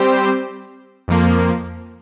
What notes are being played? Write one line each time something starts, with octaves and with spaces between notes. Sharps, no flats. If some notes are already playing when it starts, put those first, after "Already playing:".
Already playing: G3 C4 G4 C5
F2 F3 A#3